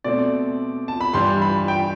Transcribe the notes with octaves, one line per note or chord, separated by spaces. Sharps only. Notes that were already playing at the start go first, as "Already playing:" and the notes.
B2 A3 C4 D5
A5
B5
G2 E3 G3 C6
B5
G5